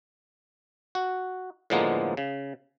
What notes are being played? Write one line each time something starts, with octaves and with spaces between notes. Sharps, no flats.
F#4
A2 D3 F3 G#3 A#3 B3
C#3